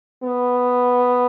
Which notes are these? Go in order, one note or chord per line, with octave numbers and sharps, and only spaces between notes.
B3